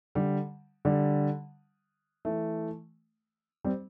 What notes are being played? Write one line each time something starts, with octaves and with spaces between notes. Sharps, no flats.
D3 G3
D3 G3
E3 A3
G3 C4